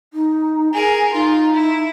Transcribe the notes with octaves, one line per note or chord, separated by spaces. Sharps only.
D#4
G#4 A#4 G#5
D#4 F4
E4